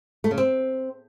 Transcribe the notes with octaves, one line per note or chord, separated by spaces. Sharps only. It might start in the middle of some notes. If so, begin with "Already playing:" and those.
A3
C#3
C4